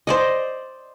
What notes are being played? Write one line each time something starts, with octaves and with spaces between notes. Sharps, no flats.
C5 D5 D#5